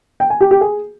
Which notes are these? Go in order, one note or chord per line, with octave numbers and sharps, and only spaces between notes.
G5
G#5
G4
G4
G#4